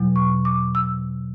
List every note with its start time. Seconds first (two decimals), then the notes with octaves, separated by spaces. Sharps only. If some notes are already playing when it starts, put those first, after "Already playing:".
Already playing: E2 B2 F#3
0.16 C#6
0.45 D6
0.75 E6